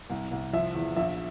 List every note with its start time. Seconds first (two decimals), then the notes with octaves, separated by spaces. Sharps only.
0.10 C2
0.31 C2
0.53 F3 E5
0.75 E2
0.96 A#1 E5